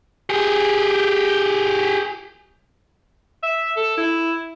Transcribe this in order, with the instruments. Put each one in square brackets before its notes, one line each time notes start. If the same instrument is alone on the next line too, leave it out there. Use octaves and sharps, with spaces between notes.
[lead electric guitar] G4 G#4
[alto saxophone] E5
A4
E4